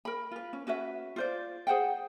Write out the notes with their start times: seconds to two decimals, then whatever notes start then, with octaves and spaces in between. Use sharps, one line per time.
0.05 A#4 B5
0.31 F4 B4
0.53 C#4
0.67 C#4 F#4 B4 E5
1.16 F4 C5 D5
1.67 G#4 C5 F#5 G5